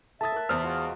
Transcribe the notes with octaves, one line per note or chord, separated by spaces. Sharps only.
A4 E5 A5 D#6 A6
A#4 F#6
E2 C5 F6
G#3 F4 F#4